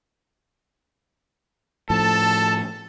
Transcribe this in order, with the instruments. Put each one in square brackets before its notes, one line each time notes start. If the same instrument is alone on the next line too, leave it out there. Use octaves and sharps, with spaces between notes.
[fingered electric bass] A2 F3 [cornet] A4 [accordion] A5